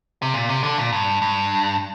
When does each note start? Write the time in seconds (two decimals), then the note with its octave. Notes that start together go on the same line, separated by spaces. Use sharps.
0.22 C3
0.34 A#2
0.49 C3
0.63 D3
0.78 A#2
0.92 G2
1.22 G2